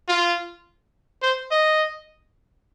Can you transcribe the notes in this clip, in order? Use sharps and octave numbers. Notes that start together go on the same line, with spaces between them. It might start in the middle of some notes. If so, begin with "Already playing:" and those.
F4
C5
D#5